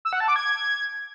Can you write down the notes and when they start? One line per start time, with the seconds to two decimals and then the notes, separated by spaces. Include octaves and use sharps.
0.05 E6
0.13 F#5
0.20 A5
0.28 D6
0.36 G#6